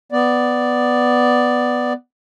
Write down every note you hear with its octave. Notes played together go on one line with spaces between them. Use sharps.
B3 D5